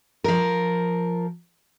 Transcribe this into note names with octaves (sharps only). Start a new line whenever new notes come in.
F3 A#4